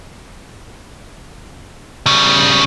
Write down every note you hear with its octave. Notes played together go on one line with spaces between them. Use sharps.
C#3 G3